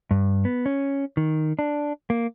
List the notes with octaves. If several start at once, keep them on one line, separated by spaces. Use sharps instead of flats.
G2
B3
C#4
D#3
D4
A#3